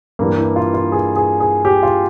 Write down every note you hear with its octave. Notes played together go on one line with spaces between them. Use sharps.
G2 E3 G3 A#3
E4
F4
F4
G#4
G#4
G#4
G4
F4